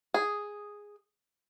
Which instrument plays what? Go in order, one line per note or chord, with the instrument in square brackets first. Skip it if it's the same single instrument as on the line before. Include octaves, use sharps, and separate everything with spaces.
[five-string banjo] G#4